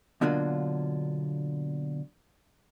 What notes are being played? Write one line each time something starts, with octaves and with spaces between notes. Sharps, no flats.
B2 D3 F#3 A#3 D4 F4